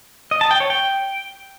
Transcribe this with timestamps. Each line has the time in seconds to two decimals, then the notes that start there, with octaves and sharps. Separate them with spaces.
0.31 D#5
0.41 A5
0.51 G5
0.60 C#5
0.70 G5